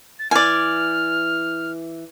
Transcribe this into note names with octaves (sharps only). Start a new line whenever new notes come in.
A6
E3 D5 G#5 F6